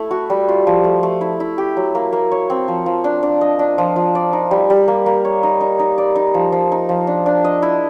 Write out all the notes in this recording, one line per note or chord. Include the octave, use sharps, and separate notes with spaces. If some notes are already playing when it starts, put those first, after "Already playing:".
Already playing: A3 E4 A4
F#4
G3
F4
F3
A3
A3
E4
E4
G4
F#3
A#3
A#3
C#5
C4
F3
F3
D4
D4
D#5
D4
F3
F3
D5
D#4
G3
G3
A#3
A#3
C#5
D#4
D#4
D#4
D5
D#4
F3
F3
D#4
F3
D4
D4
D#5
E4